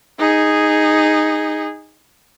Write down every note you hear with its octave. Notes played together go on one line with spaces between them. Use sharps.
D#4 G#4